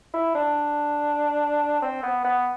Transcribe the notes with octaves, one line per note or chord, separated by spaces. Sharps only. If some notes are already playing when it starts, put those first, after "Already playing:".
E4
D4
C4
B3
B3